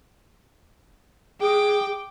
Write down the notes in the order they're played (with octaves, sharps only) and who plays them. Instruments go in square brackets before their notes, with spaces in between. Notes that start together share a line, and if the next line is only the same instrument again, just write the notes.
[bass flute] G#4 [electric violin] G5 D6